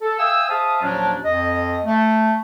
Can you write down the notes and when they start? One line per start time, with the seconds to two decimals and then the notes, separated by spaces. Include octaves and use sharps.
0.02 A4
0.19 E5 F5 G5 G#5 D#6 E6
0.49 G#4 C5 E5 F5 A5 D#6
0.82 D#2 A#2 F3 F#3 C#4 D4
1.25 F2 D#5
1.85 A3